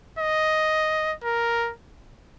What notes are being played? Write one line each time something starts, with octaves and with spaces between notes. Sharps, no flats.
D#5
A#4